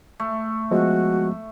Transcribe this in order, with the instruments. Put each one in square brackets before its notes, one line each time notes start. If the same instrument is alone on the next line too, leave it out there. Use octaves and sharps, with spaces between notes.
[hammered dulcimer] A3
[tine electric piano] F3 G#3 B3 [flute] F#4